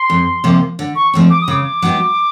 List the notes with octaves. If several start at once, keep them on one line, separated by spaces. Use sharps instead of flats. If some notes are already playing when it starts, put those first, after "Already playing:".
Already playing: C6
F2
C3 F3 A#3
D3
C#6
F3 A3 C4
D6
D#6
C#3 D6
F#3 B3 D#4 G4